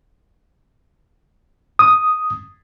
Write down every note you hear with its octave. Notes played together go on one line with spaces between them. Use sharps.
D#6